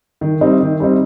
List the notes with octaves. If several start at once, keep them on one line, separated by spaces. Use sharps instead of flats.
D#3
G3 C4 D#4
D#3
G3 C4 D#4